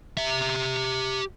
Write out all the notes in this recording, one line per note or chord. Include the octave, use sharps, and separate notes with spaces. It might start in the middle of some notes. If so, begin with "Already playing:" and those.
G4 E5